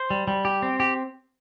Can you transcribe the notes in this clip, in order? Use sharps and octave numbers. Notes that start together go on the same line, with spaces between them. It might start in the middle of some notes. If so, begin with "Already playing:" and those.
Already playing: C5
G3
G3
G4
C4
G4